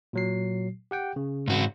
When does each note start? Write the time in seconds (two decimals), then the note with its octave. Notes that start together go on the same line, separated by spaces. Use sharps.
0.13 A#2 F#3 C7
0.91 G4 F#5 G5
1.16 C#3
1.48 G#2 F#4